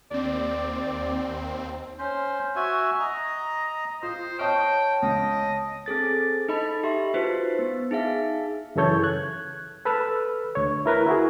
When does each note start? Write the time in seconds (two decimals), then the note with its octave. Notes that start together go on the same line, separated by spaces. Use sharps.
0.11 D#2 C4 D5
1.98 C#4 C5
2.56 F#4 E5 G#5
2.99 D#5 A#5
4.02 F4 C5 D#6
4.39 C#5 D#5 G5 A5 C#6 F6
5.02 C#2 D#5
5.86 C4 G#4 A4 A6
6.49 D#4 A4 D#5 B5
6.83 G4 E5 C6
7.14 D#4 F4 F#4 B4 C5
7.59 B3
7.91 D#4 G#4 E5 F5
8.76 F#2 C#3 E3 A4 C#5 G6
9.04 F#6 G#6
9.85 A4 B4 B5 E6 F6
10.55 D2 C#5
10.86 E4 A#4 B4
11.06 E4 F#4 G#4